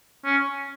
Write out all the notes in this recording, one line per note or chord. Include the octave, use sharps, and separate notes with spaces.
C#4